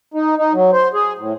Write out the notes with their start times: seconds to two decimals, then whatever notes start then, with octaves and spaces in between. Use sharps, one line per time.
0.14 D#4
0.37 D#4
0.53 F#3
0.73 C5
0.94 G#4
1.18 A2